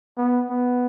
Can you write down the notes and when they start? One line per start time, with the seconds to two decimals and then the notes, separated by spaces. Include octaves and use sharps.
0.17 B3
0.50 B3